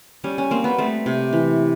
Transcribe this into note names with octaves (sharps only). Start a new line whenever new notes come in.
G3 C#4
C#4
A#3 C4
B3
A3 C4
C3
E3